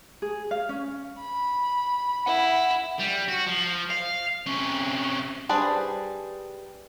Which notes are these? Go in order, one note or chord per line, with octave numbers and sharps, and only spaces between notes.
G#4
F5
C#4
B5
E4 F#5
G3
F#4
F3
F5
C3 C#4
G3 D4 G#4 B4 C5